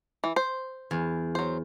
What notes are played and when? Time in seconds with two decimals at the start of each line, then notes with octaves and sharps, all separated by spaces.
0.24 E3
0.36 C5
0.91 E2
1.35 F#3 C5